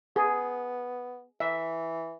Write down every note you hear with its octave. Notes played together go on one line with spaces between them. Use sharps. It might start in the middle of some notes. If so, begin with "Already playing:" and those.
B3 G#4
E3 E5